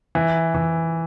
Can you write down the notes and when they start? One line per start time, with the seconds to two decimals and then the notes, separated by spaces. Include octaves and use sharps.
0.15 E3
0.54 E3